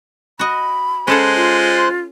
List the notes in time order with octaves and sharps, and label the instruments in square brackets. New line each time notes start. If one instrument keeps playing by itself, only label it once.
[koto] F#4 D#5 [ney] B5
[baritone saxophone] G#3 [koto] C#4 A4 F#5 [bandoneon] C5 C6 F#6
[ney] F4